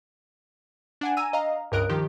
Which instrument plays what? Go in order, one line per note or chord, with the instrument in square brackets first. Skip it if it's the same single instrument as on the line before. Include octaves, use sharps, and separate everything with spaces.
[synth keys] D4 F#5 G#5
G#5 A#5 E6 D#7
D#5 F5 A#5
C#2 G2 A#4 D#5 F#6 D7
D#3 F3 G4